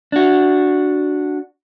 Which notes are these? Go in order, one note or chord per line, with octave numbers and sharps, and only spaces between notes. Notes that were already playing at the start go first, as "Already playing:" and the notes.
D4 F#4